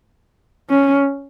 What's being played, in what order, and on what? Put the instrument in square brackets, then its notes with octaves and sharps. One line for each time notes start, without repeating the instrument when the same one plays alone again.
[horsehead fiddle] C#4